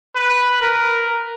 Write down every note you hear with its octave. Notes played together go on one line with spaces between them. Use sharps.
B4
A#4